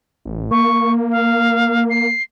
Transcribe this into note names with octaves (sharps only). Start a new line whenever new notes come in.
A1
A#3 C#6
F5
C7